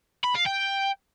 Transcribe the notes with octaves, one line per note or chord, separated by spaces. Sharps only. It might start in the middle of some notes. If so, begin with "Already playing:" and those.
B5
F5
G5